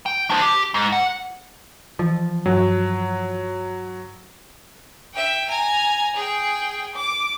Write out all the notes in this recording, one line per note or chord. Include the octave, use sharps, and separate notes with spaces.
G5
D4 C5
G4
G#2
F#5
E3 F3
G2 F#3
E5 G5
G#5 A#5
G#4 G5
D6